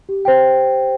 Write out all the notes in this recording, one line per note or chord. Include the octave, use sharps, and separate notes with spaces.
G4
C5 G5